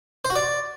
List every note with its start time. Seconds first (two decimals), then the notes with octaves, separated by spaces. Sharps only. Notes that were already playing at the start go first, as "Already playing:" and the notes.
0.25 C5
0.30 F#4
0.36 D5